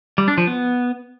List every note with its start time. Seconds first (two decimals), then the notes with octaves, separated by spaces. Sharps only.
0.18 G3
0.28 D4
0.38 F3
0.47 B3